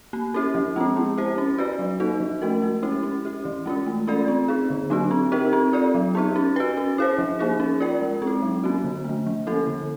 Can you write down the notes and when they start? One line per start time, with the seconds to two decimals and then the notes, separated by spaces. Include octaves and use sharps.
0.13 A#3
0.34 C#4 E4 G4
0.55 F3
0.76 G#3 C4 E4
0.96 B3
1.17 E4 G4 C5
1.38 C#4
1.58 F#4 B4 D5
1.79 F#3
2.00 A#3 D#4 F#4 A4
2.20 F3
2.42 A3 C#4 F#4 A#4
2.62 G#3
2.83 C#4 E4 G4
3.03 C#4
3.25 E4 G4
3.45 E3
3.66 G#3 C#4 F4
3.86 A3
4.07 C#4 F4 A4 D5
4.28 C4
4.48 D#4 G#4
4.70 D3
4.90 F#3 A#3 D4 F#4
5.11 C4
5.32 D#4 G4 A#4
5.53 C4
5.73 F4 A4 D5
5.95 F#3
6.15 B3 D#4 G4
6.36 C#4
6.56 F#4 B4
6.77 C#4
6.98 E4 G#4 C5
7.18 F3
7.39 A#3 D#4 G#4 C5
7.60 C#4
7.80 F4 A#4 D5
8.01 G#3
8.22 C4
8.27 E4
8.42 F#3
8.64 A#3 C#4 F#4
8.84 D3
9.05 F3 A3
9.27 F3
9.47 A#3 C#4 E4 A4
9.67 D3